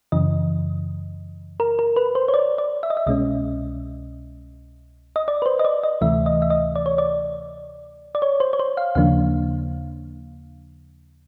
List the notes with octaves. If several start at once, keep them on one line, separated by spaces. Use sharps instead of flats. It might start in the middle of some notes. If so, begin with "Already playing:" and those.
F#2 C#3 E3 D#5
A#4
A#4
B4
C5
C#5
D5
D5
E5
D#5
E5
C2 B2 G#3 C#4 D#5
D#5
D5
B4
C5
D#5
D5
D#5
D2 C3 E3 A3 E5
D#5
E5
D#5
D5
C#5
D5
D5
C#5
C5
C#5
C5
F5
D#2 C#3 F3 A#3 D4 F5